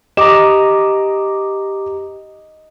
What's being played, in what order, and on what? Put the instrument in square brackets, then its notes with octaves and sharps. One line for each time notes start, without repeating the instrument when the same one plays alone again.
[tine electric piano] G4 A#5 [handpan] D#5 [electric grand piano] D6 E7